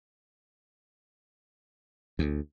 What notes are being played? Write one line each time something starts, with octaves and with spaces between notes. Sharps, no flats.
D2